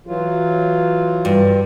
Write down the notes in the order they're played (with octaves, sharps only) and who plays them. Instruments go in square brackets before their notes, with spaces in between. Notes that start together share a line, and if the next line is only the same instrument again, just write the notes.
[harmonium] E3 F#3 F4
[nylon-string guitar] G2